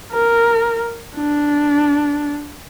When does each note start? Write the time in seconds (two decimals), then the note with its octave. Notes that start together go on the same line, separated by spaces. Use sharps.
0.12 A#4
1.15 D4